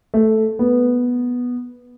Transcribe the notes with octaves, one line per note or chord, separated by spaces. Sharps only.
A3
B3